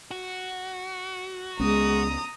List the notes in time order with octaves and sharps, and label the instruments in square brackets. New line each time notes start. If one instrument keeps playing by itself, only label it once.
[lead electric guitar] F#4
[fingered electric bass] C#2 B3 C#4 [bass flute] G#3 [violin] A#5 D#6